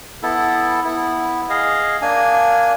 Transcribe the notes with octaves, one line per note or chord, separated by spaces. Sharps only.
B3 E4 A4
B3 E4
G#4 D#5 F5
A#3 D4 G#5